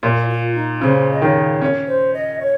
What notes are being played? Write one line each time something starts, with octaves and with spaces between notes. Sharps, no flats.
A#2 F4
F4
D#4
C#3 C5
D#5
D#3 C#5
C#4
C5
D#5
C#5